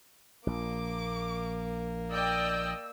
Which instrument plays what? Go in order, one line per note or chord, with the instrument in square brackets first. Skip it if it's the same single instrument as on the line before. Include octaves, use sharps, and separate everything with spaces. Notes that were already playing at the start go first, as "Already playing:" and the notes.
[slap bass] A#1 [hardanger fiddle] A#3 [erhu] D6
[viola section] D5 D#5 G5 [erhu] E6